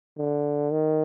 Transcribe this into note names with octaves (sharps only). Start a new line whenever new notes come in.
D3
D#3